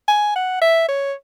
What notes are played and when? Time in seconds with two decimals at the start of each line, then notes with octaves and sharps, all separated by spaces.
0.08 G#5
0.35 F#5
0.61 E5
0.89 C#5